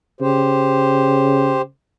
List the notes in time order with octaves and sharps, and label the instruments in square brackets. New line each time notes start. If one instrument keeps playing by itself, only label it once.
[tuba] C#3 [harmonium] G4 C5